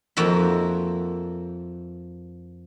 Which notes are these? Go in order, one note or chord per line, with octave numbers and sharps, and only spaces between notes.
F2 A#3 F#4 E5